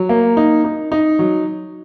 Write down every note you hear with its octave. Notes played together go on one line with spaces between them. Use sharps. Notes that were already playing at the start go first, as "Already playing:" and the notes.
Already playing: F#3
A#3
D#4
D#4
D#4
F#3